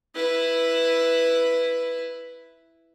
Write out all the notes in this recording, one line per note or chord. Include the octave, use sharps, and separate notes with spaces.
E4 B4